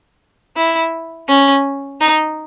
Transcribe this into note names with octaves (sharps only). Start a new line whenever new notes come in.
E4
C#4
D#4